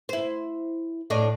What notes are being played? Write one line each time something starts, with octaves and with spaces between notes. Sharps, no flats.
E4 C5
A2 D4 D#5